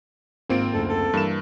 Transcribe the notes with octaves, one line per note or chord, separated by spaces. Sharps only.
G#1 A#3 C4 F4 D7
F#1 D2 A4
A4
G2 E3 A#3 E7